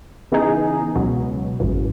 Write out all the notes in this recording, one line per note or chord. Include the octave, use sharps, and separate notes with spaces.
C#3 E3 B3 D#4 G#4
C#2 B2 F#3
G#1 F#2 E3